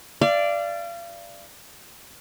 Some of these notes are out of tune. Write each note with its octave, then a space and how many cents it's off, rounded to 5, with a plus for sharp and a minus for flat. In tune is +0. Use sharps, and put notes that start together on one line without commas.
D5 +0 F5 -35